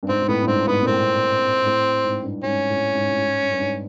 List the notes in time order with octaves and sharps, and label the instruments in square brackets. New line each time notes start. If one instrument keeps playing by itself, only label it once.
[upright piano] G2
[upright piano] G#2 [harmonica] C4
[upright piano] G#2
[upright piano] A2 [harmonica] B3
[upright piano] G2
[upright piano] G#2 [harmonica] C4
[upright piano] G#2 [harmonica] B3
[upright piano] A#2
[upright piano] A2 [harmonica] C4
[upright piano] A2
G#2
G2
[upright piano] G#2 [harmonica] C#4
[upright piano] A2
G#2
A2
G#2
G2
G2
G#2